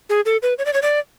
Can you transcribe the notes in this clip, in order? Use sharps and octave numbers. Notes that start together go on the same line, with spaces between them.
G#4
A4
B4
C#5
D5
C#5
D5